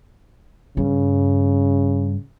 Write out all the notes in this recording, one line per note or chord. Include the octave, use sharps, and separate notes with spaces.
G2 C#3